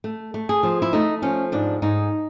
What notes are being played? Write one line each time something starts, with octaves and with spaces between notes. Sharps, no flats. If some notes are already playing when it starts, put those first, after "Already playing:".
A3
A3
G#4
F3
E4
A3 D#4
F3 C#4
G#2 D4
G#2 D#4